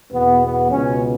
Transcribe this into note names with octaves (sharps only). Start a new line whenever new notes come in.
E2 B2 B3
B3
C#2 B2 C#4